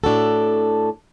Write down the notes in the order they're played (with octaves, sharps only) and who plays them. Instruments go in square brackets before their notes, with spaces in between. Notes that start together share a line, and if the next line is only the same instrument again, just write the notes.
[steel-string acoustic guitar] A2 D4 F#4 A4